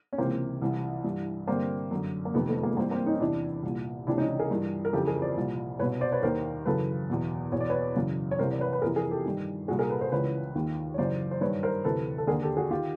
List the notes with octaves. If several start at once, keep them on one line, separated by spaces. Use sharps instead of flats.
C#4
C#2 C3 E3 A#3 C4
C2 C3 E3
G2 E3
G2 D3 A#3 C4
F#2 D3
A#3
F2 C3 D#3 A3 B3
A3 B3
G#3 A#3
G2 E3 A#3 C4
A#3 C4
C#4 D#4
E2 C3 E3 D4 E4
C2 A#2
C#2 C3 E3 D4 E4
C#4 D#4
G#4 A#4
G2 E3
A#4
F2 C#3 E3 G4 A4
G#4 A#4
C5 D5
C2 A#2
C2 B2 B4 C#5
C5 D5
B4 C#5
D#2 D#3 A#4 C5
F#2 C#3 E3 A4 B4
E2 B2
E2 B2 C#5
D5
B4 C#5
F#2 C#3 E3
C#5
C2 C3 E3 A#4 C5
D5
B4 C#5
B4
F2 C3 E3 G#4 A#4
G#4 A#4
G4 A4
G2 D#3
C2 A#2 F#4 G#4
G#4 A#4
A4 B4
A#4 C5
C#2 C#3 E3 B4 C#5
D#2 D#3
C#5
F#2 C#3 E3 C5 D5
C5
G2 D#3 B4 C#5
A#4 C5
D2 C3 E3 A4 B4
A4
D#2 D3 G#4 A#4
G4 A4
F#4 G#4
D#3 F4 G4